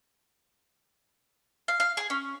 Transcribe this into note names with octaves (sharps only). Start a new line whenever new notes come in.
F5
F5
G#4
C#4